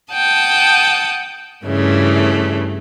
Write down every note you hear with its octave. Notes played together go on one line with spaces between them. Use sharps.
F#5 G5 A5 D#6
G2 C#3 E3 A3